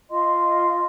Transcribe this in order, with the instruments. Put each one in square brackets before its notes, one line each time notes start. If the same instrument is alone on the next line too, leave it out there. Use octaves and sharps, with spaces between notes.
[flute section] F4 D#5 F5 C6